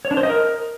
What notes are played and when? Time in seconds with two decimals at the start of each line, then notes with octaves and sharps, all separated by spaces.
0.05 C#5
0.11 D4
0.17 C5
0.23 D#5
0.30 A#4